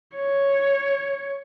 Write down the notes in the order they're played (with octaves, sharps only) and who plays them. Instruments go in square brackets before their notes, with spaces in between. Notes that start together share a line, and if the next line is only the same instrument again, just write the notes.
[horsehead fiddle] C#5